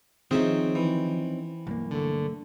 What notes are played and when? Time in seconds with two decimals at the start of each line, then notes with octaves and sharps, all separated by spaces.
0.31 D#3 F3 C4 C#4 D#4 G#4 E5
0.75 E3
1.67 B1 G2 A#3
1.91 D3 A3